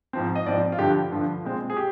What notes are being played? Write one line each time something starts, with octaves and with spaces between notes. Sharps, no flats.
G#2 F3 C4
D#5
G#2 F3 C4 D5
F4
G2 D3 F3 G4
G2 D3 F3
A#2 G#3 C4
G#4
G4